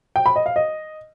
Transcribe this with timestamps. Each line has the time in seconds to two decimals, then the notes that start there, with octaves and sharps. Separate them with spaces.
0.16 G5
0.26 B5
0.36 D#5
0.46 F5
0.56 D#5